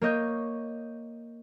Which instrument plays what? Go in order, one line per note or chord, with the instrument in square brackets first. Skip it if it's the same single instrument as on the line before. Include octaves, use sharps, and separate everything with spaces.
[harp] A#3 C#5 D#5 G6